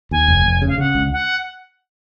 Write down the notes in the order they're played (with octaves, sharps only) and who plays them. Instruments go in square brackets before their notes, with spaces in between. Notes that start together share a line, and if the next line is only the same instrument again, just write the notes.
[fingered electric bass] D#2 [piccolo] G#5
[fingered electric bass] F1
F1
C#3
[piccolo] F5
[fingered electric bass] C#3 [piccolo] F#5
[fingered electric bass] C#2
[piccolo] F#5